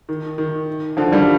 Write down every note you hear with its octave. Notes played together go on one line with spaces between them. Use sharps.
D#3
D#3
D3 F3
D#3 G3